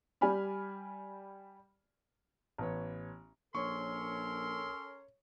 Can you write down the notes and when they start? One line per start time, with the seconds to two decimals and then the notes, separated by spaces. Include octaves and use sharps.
0.21 G3 G4 D5 G#5 B5 F6
2.58 A1 B3 C#5
3.55 A#1 C#4 A4 A#4 C#5 C6 C#6